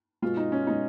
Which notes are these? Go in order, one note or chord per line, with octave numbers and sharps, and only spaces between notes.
B2 G#3 F4
D#4
C#4
B2 G#3 D#4